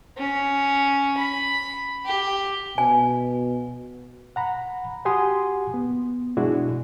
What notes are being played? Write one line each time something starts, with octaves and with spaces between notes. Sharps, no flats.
C#4
B5
G4
B2 G#5
F#5 A#5 B5
F#4 G4 F#5 G#5 C6 D#6
B3
B2 G#3 D4 E4 F#4 G#4